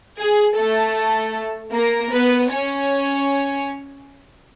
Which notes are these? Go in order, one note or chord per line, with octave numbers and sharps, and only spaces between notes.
G#4
A3 A4
A#3 A#4
B3 B4
C#4 C#5